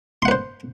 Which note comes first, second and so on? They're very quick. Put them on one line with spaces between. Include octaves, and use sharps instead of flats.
C6 F#5 B4 C5